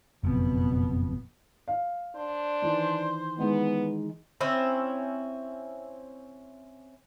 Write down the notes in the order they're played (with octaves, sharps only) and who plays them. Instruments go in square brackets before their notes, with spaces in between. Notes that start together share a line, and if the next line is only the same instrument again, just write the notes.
[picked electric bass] F#1 F2 [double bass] B2 B3
[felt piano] F5
[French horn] D4 [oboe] C5
[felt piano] D#3 E3
[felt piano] D#3 E3 G#3 [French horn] B3
[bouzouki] C4 C#4 E4 C5